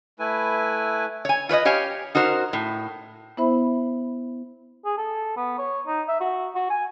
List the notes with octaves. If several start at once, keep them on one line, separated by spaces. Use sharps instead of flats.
A3 E4 B4 G#5
C#5 G#5
F4 B4 C#5 D#5
G4 C#5 F5 G#5
D#4 F#4 A#4 C5
A2
B3 E4 C5 E5 B5
G#4
A4
B3
C#5
D#4
E5
F#4
F#4
G#5